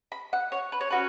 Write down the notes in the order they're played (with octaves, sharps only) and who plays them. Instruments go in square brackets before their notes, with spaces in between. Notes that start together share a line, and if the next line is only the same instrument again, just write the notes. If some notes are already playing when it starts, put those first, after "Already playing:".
[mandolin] B5
F#5
C#5
B4
C#5
C#4 F#4 B4